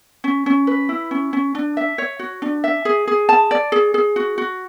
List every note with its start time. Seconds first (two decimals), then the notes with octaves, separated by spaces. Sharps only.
0.24 C#4
0.46 C#4
0.67 B4
0.89 E4
1.11 C#4
1.33 C#4
1.55 D4
1.77 E5
1.98 C#5
2.19 F#4
2.42 D4
2.64 E5
2.85 G#4
3.07 G#4
3.29 A5
3.51 D5
3.72 G#4
3.94 G#4
4.16 F#4
4.38 F#4